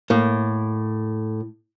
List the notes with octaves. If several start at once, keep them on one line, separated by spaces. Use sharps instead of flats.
A2 A#3